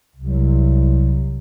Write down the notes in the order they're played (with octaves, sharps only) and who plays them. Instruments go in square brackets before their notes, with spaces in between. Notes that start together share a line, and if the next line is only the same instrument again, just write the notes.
[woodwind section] C2 C3 F#3